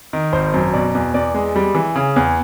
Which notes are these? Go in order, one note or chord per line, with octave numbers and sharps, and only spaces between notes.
D#3
G#1 C5
F#2
B2 D5
E2
E2 D5
G#3
G3
E3
C#3
E2